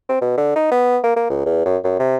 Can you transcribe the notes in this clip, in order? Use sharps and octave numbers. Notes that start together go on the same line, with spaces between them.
C4
B2
D3
D#4
B3
A#3
A#3
C#2
E2
F#2
F#2
C3